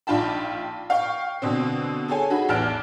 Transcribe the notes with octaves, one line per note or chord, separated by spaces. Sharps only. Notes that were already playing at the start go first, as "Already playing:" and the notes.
A#1 D#4 F4 G5 A5 B5
F5 G5 C#6
B2 D3 C4
G#4 A4 C#5 G#5
D#4 F#4 G#4 B5
A1 E2 A5 F6 F#6 D7